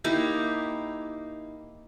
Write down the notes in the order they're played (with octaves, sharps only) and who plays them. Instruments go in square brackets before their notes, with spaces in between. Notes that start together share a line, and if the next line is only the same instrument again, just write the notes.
[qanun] A#3 D#4 E4 G4